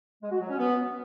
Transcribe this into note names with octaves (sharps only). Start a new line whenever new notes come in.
G#3
F#4
F#3
C#4
B3